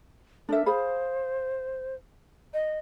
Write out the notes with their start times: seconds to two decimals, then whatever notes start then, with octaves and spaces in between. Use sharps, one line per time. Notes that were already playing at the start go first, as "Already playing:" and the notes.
0.49 D4 A4 A#4 E5
0.66 G#4 C5 F5 B5
2.54 D#5